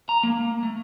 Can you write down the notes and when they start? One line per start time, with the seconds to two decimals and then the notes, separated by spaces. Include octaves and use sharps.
0.09 A#5
0.23 A#3
0.63 A3